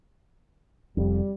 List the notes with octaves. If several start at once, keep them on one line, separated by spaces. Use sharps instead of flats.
F1 F2 G3